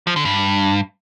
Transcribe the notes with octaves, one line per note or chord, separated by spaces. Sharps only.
F3
D3
G2